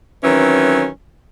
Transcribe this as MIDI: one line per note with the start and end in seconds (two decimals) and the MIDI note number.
0.24 0.88 51
0.24 0.88 52
0.24 0.88 54
0.24 0.88 60
0.24 0.88 61